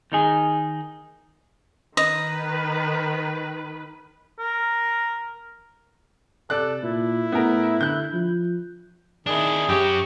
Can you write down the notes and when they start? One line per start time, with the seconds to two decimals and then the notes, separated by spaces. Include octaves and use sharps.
0.12 D#3 D#4 G#4
1.97 D#3 B4 D#5
4.39 A#4
6.50 C3 A4 D5 F#6
6.83 A#2 E4
7.32 A2 B3 A#4
7.81 D3 F#6 G6
8.13 F3
9.26 D#3 D4 E4 G#4
9.69 F#2 G4 C#5